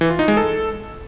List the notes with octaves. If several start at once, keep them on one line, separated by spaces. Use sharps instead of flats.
E3
F4
D#4
G#3
A4